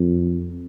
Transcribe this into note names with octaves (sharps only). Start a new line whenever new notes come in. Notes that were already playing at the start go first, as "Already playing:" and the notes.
Already playing: F2